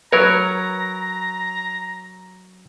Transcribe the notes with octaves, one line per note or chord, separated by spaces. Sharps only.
F#3 A#4 B4 C#5 A#5